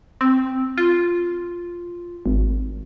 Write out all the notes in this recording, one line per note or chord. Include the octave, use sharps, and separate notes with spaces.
C4
F4
G#1